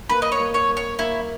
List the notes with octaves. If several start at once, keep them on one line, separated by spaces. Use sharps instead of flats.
A#3 B4
D#5
C#5
A#3
C#5
A#3
C#5
A#3 E4